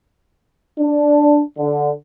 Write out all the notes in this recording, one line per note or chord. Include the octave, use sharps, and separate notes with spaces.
D4
D3